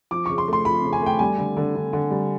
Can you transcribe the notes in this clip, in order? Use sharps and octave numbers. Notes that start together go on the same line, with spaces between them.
F3 D6
C#3 C#6
C6
A3
C6
F3 B5
C#3
G#5
A3 G5
G3 G#5
D3
D3
D3
D3
G3